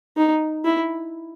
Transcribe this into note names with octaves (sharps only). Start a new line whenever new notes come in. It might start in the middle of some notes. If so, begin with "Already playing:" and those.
D#4
E4